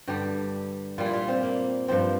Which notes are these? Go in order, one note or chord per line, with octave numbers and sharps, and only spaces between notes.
G2 D3 G3 G4
A#2 G3 F4
E4
F4
C4
A#3
G2 F3 C4